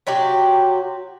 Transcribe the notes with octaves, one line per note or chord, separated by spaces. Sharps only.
C3 F#3 F#4 G4